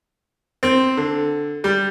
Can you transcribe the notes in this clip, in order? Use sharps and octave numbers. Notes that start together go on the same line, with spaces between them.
C4
D3
G3